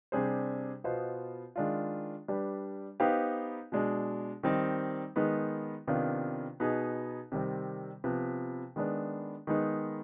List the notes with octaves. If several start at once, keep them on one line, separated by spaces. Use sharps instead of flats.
C3 G3 D4 G#4 C5
B2 B3 F4 C5 D#5
D#3 G#3 D4 F4
G3 D4 G4 B4
B3 D#4 G4 C5 F5
B2 G#3 D4
D#3 G3 C4 D#4
D#3 G#3 B3 D#4
C3 D#3 B3 D4 F4
B2 B3 D#4 G#4
C3 D#3 G3 C4
C3 F3 B3
D#3 G#3 B3 D4
D#3 G#3 B3 D#4